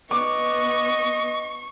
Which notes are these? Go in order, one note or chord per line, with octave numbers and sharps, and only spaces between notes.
B3 D#5 C#6 D6